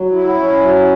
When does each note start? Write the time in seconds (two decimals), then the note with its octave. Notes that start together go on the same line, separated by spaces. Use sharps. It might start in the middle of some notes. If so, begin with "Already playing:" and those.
Already playing: F#3
0.12 E4
0.36 C#4
0.60 F#3